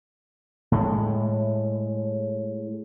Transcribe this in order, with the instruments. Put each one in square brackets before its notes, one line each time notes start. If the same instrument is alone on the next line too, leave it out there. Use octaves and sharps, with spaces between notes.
[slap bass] A2 G#3